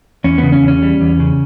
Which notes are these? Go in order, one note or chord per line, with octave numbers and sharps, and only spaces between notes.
E2 C#4
B3
C#3
C#4
E2
C#4
G3
E2
C#3